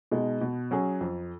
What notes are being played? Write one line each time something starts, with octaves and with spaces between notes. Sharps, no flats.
B2 G#3 D#4
B2
F#3 C#4 G#4
F2